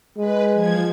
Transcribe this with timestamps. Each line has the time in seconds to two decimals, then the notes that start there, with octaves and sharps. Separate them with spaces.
0.17 G#3 B4
0.54 F3 G#6